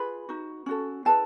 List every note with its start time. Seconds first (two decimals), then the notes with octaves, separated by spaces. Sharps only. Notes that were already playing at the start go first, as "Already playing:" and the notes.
Already playing: F4 G#4 B4 B5
0.29 D#4 F#4
0.66 C#4 F#4 A4
1.05 E4 G#4 B4 A5